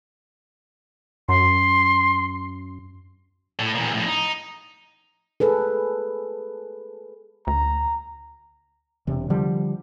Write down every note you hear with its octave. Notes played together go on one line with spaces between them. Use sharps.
F#2 C6
A2
E2 A#2
F2 A2
D#4
G#4 A4 B4
D2 A#5
E1 C3
D3 F3 G3